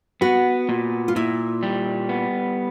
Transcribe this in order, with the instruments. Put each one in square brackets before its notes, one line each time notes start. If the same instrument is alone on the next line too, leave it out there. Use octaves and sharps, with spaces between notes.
[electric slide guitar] B3 [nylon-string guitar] F#4
[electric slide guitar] A#2
[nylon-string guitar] F4
[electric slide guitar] A#2 [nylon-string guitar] E4
[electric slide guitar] G3
B3